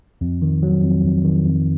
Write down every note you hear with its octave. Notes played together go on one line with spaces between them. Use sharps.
F2
D#3
F#3
F2
F2
D#3
F2